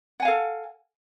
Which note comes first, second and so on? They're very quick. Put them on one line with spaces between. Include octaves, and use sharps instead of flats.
F#5 G#5 F5 A4